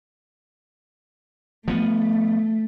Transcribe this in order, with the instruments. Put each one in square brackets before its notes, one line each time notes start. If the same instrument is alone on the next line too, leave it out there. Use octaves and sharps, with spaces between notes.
[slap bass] F3 B3 [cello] A3